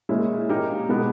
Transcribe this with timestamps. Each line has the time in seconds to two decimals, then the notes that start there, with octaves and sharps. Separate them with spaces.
0.09 A#2 G#3 C#4 E4
0.49 A#2 A#3 D#4 G4 A#4
0.89 B2 G#3 B3